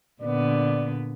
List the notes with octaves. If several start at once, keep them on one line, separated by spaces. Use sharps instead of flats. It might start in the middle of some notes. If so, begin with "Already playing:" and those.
A#2 D3 B3 D5